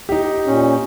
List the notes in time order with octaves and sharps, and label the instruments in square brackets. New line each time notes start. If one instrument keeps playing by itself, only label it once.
[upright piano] D#4 G4
[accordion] A#2 C#4